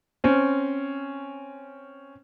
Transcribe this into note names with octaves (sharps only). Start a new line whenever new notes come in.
C4 C#4